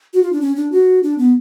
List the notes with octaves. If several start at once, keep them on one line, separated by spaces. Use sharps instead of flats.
F#4
F4
D4
C#4
D4
F#4
D4
B3